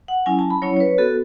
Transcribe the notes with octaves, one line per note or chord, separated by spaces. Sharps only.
F#5
F#3 C#4 E4 G#5
A5
B5
F#3 C#4 E4 C#5
C#5
B4
B3 F#4 A4